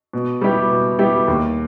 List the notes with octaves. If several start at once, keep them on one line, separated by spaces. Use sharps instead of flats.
B2
G3 B3 E4 G4
B2
G3 B3 E4 G4
D#2